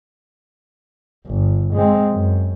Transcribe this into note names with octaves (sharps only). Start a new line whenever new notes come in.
G1
G#3 C4
F#2